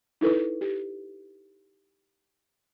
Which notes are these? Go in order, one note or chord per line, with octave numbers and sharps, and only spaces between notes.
D#4 E4 A4 B4
G4